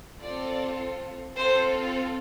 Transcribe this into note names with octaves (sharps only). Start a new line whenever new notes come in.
C4 F4 A4 D5
C4 F4 A4 C5